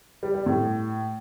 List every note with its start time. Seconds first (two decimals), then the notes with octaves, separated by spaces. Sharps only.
0.23 G3
0.34 G3
0.46 A2